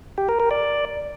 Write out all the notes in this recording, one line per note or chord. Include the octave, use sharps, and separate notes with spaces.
G4
A#4
A#4
D5